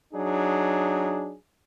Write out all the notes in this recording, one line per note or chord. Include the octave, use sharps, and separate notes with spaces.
F#3 D4 D#4 G#4